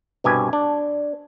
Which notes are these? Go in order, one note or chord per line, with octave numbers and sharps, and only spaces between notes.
C2 G2 B2 G4 G#5
D4